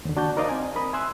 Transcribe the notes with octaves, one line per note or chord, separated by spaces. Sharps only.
D#2 D3
D4 F#4 A5 G6
D#4 A#4 C5 D5 D#5 F5
C4 G#5
A#4 B5 D#6
E5 G#5 C6 E6 F#6